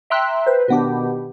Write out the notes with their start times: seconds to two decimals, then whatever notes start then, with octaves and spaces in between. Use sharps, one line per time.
0.10 E5 G5 A#5 C6 E6 F#6
0.46 B4 C5
0.68 B2 D#3 B3 D4 G4